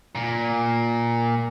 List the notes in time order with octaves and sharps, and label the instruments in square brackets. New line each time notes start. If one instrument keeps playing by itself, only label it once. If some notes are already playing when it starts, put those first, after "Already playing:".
[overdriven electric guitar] A#2